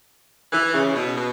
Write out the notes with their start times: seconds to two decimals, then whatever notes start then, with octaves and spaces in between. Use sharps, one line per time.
0.52 E3
0.73 C#3
0.94 B2
1.16 B2